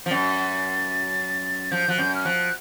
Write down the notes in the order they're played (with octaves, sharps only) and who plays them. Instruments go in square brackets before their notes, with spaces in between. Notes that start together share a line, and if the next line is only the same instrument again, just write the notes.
[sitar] F3
[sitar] F#2 [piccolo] A6
[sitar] F3 [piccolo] G6
[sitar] F3 [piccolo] F#6
[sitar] F#2 [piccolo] G6
[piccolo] F6
[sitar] F3 [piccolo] F#6